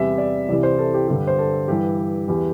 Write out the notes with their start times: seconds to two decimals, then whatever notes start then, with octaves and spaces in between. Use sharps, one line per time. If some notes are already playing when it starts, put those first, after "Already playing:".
Already playing: E2 C3 G3 E5
0.18 D5
0.48 C2 C3 E3 G3 D5
0.63 C5
0.78 A4
0.94 G4
1.08 G2 D3 G3 G4
1.27 C5
1.38 A4
1.68 G2 E3 G3 G4
2.28 E2 E3 G3